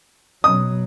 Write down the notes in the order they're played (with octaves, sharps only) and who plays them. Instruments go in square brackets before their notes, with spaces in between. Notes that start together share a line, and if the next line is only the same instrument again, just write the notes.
[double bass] B2 F#3 [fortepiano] D#6